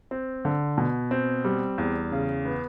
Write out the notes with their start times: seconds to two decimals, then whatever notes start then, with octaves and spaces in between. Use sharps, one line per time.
0.11 C4
0.45 D3
0.78 B2
1.11 C4
1.44 G3
1.78 E2
2.12 C#3
2.45 B3